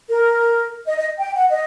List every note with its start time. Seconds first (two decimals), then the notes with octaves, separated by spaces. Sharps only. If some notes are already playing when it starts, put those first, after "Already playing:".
0.09 A#4
0.87 D#5
0.97 D#5
1.18 G5
1.34 F#5
1.50 D#5